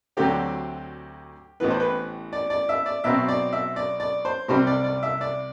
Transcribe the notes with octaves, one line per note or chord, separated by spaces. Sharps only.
D2 D3 F#3 A3 C4 G4
A1 A2 E3 B3 B4
C5
B4
D5
D5
E5
D5
B1 B2 F#3 C4 E5
D5
E5
D5
D5
C5
C2 C3 G3 C5
D5
D5
E5
D5